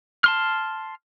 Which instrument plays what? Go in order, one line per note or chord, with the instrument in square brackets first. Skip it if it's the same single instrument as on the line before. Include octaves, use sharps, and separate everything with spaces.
[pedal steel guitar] A5 C6 F6